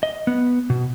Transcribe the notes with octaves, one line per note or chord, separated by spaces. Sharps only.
D#5
B3
B2